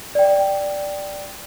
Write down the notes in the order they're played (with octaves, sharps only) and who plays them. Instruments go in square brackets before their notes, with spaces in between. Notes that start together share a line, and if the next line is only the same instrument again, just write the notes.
[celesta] D5 G5